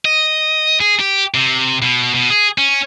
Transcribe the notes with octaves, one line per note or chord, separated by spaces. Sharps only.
D#5
G#4
G4
C3
B2
B2
G#4
C#4